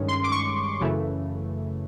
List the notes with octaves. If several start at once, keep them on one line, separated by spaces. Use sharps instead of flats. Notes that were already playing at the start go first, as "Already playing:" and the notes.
Already playing: G2 D#3 G#3 C#4
C6
D6
C#6
F#2 C#3 E3 A3